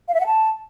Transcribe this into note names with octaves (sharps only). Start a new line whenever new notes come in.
F5
E5
F#5
A5